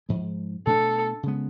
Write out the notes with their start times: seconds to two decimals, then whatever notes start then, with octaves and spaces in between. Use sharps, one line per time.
0.09 G#2 F3 G#3
0.66 B2 A3 D4 A4
1.23 C#3 G#3 B3